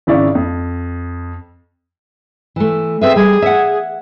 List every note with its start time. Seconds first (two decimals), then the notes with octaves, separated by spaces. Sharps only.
0.07 G#1 C#3 E4 D5 F5 C#6
0.35 F2
2.56 E3 A3
3.01 C4 G#4 B4 E5
3.16 G3 G#4
3.42 E5 F#5